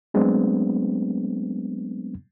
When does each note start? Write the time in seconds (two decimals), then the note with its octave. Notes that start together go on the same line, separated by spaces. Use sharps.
0.14 F#3 G#3 A3 B3 C4 D4